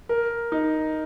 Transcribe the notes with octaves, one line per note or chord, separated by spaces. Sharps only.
A#4
D#4